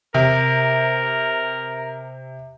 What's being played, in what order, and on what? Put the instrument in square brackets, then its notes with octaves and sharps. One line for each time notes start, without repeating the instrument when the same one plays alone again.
[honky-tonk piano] C3 [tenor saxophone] A#4